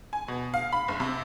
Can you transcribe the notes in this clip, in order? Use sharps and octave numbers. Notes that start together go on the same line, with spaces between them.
G#5
B2
F5
B5
F#1
C3